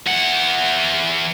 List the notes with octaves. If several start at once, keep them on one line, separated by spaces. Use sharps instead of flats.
E3 F#5